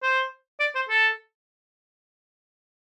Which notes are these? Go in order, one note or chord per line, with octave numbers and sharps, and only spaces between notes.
C5
D5
C5
A4